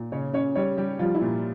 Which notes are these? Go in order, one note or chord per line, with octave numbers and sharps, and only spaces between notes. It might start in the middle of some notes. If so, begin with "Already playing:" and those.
Already playing: A#2
C#3 C#4 C#5
C#3 C#4 C#5
G3 C#4 C#5
G3 G4
F3 G3 F4
E4
A#2